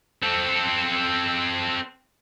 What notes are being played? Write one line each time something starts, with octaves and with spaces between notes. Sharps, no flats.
C4 A4